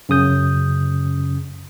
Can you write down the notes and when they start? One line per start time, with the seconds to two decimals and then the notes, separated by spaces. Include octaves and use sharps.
0.09 F#2 C#3 D#6 G6